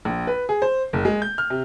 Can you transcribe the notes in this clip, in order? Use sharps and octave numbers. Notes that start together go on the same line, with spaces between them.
A#1
B4
G#4
C5
F#1
G#3
G6
F6
C3